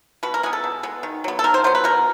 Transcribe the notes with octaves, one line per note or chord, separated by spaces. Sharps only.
B2 B4
A#4
G#3 B3 G#4
A4
B2
G#3 B3
D#3
F#3 B3
A4
D#3 A#4
C5
F#3 B3 C5
B4
B2 A#4